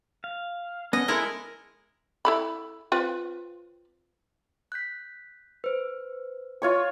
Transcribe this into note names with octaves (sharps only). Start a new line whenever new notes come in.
F5
B3 C#4 D#5
G#3 E4 A4 A#4
E4 A4 B5
C4 F4 B4
F#6 G6 B6
B4 C5
F4 C#5 C#6